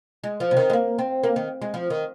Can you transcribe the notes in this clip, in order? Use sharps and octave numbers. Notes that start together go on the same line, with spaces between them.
G#3
F3
C3
D#3
G#3
A#3
C4
A#3
D#3
G#3
F3
D#3